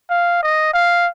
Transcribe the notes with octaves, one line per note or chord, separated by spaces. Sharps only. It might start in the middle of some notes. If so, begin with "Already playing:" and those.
F5
D#5
F5